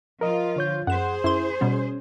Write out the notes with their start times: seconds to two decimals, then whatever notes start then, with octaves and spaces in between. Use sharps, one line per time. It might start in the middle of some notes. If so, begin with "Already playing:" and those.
0.21 F3 F4 A#4 D#5
0.56 D3 C#5 G6
0.87 F#2 G#4 C5 F#5 E7
1.24 F#2 E4 C6
1.61 B2 G3 B3 C#4